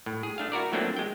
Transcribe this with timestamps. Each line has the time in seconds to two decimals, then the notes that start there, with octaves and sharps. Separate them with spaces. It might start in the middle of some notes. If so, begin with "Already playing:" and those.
0.06 A2
0.23 G#4
0.38 A3 D4 F5
0.52 E4 F#4 A#4 D5
0.73 F#3 A3 A#3 C4 D4 F4
0.96 G#3 G5